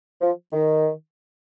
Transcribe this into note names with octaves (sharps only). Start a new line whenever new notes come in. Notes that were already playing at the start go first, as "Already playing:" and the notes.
F3
D#3